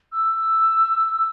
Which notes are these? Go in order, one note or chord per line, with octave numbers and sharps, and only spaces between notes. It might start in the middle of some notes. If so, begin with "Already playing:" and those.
E6